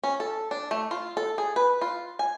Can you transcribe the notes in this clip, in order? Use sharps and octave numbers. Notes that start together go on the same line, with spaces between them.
C#4
A4
D4
A3
F4
A4
G#4
B4
F4
G#5